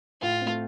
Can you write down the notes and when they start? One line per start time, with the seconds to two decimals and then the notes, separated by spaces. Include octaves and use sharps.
0.22 A2 F4
0.41 C4
0.46 A3